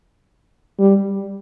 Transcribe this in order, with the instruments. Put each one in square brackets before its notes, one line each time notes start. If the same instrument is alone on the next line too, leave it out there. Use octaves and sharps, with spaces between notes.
[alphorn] G3